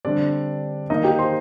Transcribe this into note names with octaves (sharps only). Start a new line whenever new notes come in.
D3 G3 C4 D4 D5
D#3 A#3 D#4 D#5
G4 G5
C5 C6